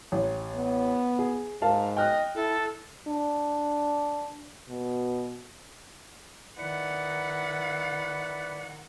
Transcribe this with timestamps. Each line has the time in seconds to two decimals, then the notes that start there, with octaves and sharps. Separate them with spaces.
0.12 A1
0.54 B3
1.19 G#4
1.62 G#2 A#4 F5 A5
1.97 D#5 G5 F6 F#6
2.35 E4 A4
3.08 D4
4.69 B2
6.58 D#3 E4 B4 D5 F#5 C#7